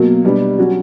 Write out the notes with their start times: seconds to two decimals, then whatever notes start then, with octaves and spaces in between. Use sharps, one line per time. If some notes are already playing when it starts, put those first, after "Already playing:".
Already playing: B2 F#3 A#3
0.24 B2 G3 B3 D4
0.58 F#3 C#4 F#4